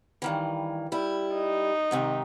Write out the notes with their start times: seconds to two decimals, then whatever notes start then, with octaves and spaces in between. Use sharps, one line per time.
0.22 G2 D#3 E3
0.92 G3 E4
1.34 D#4
1.91 G#2 C3 D#3